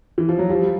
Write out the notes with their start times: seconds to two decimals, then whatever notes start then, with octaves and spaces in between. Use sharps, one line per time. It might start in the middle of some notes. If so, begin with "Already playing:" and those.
0.18 E3
0.29 F3
0.39 F#3
0.49 F3 G3